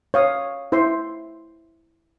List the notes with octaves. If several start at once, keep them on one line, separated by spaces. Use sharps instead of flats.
C#5 F5 D#6
E4 C5 E5 C6